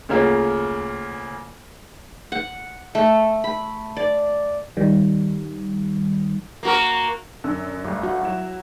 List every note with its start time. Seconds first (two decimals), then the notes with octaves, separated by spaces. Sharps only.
0.09 D2 C#3 A#3 C#4 F4
2.32 F#5
2.95 A3
3.44 B5
3.97 D5
4.77 D#3 G3
6.63 A#3 F#4 A#4
7.44 F#2 D3 E6
7.84 G1 A3
8.03 F#4
8.22 F#3 E4 E7